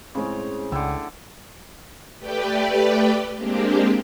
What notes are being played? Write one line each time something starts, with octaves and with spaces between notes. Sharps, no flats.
A2 C#3 G#3 C4 C#5
C#2 A2 D3 G5 E6
A3 G4 B4 D5 G5
G#3 A#3 C4 D4 G4